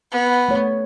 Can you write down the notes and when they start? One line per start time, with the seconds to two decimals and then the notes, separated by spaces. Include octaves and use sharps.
0.11 B3
0.49 A3 C#4 C#5